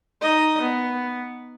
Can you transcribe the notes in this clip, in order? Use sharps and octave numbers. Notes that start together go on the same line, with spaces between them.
D#4 D#5
B3